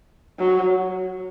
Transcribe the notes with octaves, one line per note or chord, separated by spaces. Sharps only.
F#3